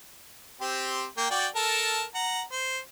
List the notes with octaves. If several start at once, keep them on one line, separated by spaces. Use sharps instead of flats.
C4 G4 C5
A#3 G5
F#4 D5 G5
A4 A#4 A5
F#5 A#5
C5